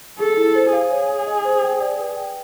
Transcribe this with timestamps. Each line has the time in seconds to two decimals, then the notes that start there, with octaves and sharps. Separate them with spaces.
0.19 G#4 A4
0.37 E4
0.55 C5
0.73 G#4 F5
0.91 C#5
1.08 G#5
1.27 D#5
1.45 C5
1.63 G5
1.81 D5
1.99 B4
2.16 G5